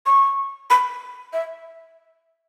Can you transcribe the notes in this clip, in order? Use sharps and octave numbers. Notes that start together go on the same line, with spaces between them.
C#6
B5
E5